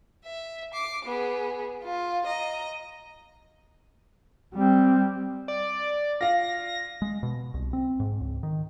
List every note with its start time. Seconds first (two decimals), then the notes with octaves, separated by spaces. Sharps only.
0.25 E5
0.74 D6 C7
1.05 B3 G#4
1.83 F4
2.26 D#5 A#5
4.54 G3 C4
5.48 D5
6.21 F4 F5 A#6
7.02 G#3
7.23 B2
7.54 C2
7.73 C4
8.00 G#2
8.21 C#2
8.43 D#3